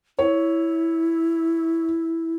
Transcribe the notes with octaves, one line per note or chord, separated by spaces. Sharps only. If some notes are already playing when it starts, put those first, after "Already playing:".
E4 C#5